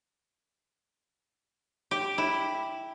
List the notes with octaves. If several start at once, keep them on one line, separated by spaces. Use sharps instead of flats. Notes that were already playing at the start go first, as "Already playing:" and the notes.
G4
E4